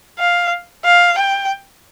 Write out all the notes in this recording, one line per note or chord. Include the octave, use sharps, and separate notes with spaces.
F5
F5
G5